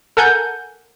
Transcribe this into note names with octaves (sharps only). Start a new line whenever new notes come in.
A4 A#4 F#5 G#5 G6